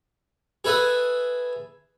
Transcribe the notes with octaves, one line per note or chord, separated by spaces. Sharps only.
G#4 A4 B4 E5 D#6